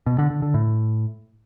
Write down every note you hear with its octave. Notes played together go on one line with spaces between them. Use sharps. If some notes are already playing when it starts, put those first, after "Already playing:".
B2
D3
D3
D3
A2